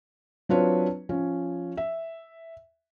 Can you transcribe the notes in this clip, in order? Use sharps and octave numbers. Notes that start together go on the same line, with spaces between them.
F#3 C4 D4 F4 B4 C#5
F3 C#4
E5